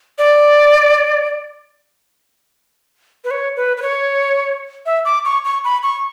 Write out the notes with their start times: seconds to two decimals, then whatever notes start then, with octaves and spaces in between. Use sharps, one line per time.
0.18 D5
3.24 B4
3.31 C#5
3.56 B4
3.77 B4
3.82 C#5
4.86 E5
5.05 D6
5.25 C#6
5.45 C#6
5.64 B5
5.83 C#6